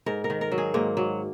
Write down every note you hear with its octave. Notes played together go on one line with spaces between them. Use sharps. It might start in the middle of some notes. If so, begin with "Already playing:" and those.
G#2 A#4
A#4
D#3
A#4
F#3
G#4
G#2 A#3
F#3